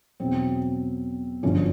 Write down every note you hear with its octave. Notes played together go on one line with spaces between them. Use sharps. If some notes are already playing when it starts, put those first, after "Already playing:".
E2 B2 F#3 C4
G1 F#2 D3 F3 C#4